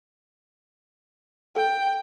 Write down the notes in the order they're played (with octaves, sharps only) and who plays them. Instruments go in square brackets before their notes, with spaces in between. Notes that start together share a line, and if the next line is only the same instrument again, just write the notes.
[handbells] A4 [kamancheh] G5